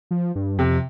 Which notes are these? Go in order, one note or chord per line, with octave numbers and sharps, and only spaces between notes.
F3
G2
F2 C3